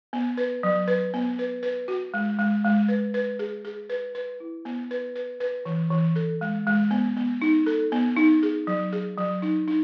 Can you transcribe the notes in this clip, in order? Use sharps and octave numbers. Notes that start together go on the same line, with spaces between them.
B3
B4
F#3
B4
B3
B4
B4
F#4
G#3
G#3
G#3
B4
B4
G#4
G#4
B4
B4
E4
B3
B4
B4
B4
E3
E3
A4
G#3
G#3
B3
B3
D#4
A4
B3
D#4
G#4
F#3
G#4
F#3
D#4
D#4